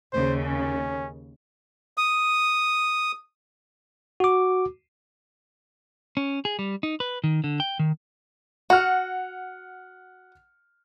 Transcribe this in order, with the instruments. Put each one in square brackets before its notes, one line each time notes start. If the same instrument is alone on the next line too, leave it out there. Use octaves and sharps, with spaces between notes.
[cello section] D#2 C#3 [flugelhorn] C5
[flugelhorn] C#4
[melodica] D#6
[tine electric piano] F#4 D6
[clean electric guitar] C#4
G#4
G3
D#4
B4
D#3
D3
G5
D#3
[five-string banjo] F#4 [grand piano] F#5 F6